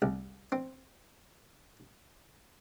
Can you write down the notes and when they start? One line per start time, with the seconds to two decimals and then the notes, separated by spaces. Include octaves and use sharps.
0.02 C2
0.52 C4